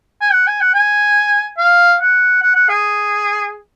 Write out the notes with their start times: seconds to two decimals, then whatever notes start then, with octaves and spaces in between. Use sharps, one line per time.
0.21 G#5
0.32 F#5
0.47 G#5
0.61 F#5
0.74 G#5
1.58 F5
2.00 F#5
2.42 F#5
2.55 F#5
2.69 G#4